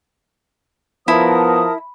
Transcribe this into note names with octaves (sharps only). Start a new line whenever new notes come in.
F3 B3 E4 A#4 A5 D#6